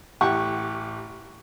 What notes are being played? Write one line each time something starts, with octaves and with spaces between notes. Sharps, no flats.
A1 G4 F#5 C#6